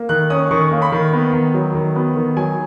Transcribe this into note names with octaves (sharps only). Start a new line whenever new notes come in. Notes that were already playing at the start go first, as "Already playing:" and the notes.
Already playing: A#3
D#3 F#6
C#4 D#6
D#3 C#6
A#3
B5
D#3
B3
D#3
F#3
D#3
B3
D#3
F#3 G#5